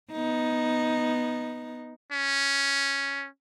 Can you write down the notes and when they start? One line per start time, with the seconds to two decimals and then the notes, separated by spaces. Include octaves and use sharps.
0.11 B3 D#4
2.12 C#4